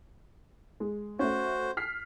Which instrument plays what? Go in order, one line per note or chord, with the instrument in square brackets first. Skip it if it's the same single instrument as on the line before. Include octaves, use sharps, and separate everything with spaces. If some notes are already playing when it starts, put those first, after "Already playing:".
[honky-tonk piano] G#3
[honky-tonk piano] A3 C#4 [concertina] F#4 C5
[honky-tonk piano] F6 B6 C7